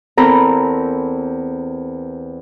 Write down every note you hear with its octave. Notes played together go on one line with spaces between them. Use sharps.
E2 C4 A4 A#4 A#5 B5